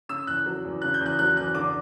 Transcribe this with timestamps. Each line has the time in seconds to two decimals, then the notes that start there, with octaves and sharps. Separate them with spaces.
0.09 C#3 E6
0.27 E2 F#6
0.46 F#3
0.64 E2
0.82 C#3 F#6
0.94 G6
1.01 E2 F#6
1.19 F#3 F#6
1.36 E2 F#6
1.55 D3 D6